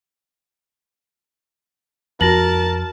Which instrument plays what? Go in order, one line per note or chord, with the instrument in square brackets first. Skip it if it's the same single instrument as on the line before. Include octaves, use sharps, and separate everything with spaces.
[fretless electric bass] F2 F3 [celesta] F#4 A#6 F#7 [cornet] A#4 [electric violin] A5